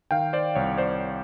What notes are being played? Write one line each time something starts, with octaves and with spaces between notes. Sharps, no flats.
D#3 F5 G5
C5 D5
C2 C#5
C5 D5